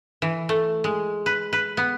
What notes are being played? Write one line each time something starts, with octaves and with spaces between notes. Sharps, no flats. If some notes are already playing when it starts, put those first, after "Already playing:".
E3
A3
G#3
B4
B4
B3